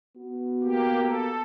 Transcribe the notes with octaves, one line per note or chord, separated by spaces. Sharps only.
B3 F#4
A#3 G4
A4